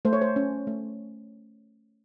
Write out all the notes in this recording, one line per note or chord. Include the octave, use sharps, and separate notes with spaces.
A3 C5
C#5
C5
C#4
A3